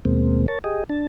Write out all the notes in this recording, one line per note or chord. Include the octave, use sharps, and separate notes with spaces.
D#2 B2 G#3 A#3 C4
A#4 C#5 A5
G4 G#4 D#5
D4 A5